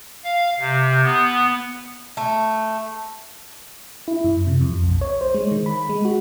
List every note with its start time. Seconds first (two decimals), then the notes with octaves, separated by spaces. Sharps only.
0.24 F5
0.59 C3
1.03 B3
2.17 A3
4.08 E4
4.24 F#2
4.47 C3
4.61 F2
4.84 B1
5.01 C#5
5.21 C5
5.34 G#3
5.51 D#3
5.66 B5
5.89 G#3
6.05 F#4